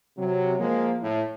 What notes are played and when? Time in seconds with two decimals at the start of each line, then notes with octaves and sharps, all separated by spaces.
0.18 C3 F#3
0.59 F3 G#3 A#3
1.01 A2